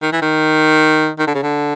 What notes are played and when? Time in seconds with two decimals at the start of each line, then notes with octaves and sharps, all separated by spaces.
0.02 D#3
0.12 E3
0.22 D#3
1.18 D#3
1.27 D3
1.34 C#3
1.42 D3